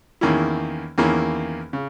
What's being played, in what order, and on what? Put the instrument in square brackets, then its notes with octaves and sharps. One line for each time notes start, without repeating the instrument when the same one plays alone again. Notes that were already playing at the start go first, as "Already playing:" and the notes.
[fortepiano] E2 D#3 A#3 C#4 E4
E2 D#3 A#3 C#4 E4
C#3